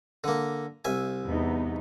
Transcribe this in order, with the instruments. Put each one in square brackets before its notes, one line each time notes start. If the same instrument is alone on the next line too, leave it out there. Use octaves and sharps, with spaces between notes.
[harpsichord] D3 A#3
C2 E5 G#5
[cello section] E2 B3 D#4